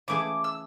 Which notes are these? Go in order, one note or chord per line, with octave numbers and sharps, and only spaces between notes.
C#3 E3 A3 E4 G#4 D6
E6